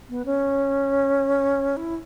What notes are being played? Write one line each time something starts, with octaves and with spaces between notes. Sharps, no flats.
B3
C#4
E4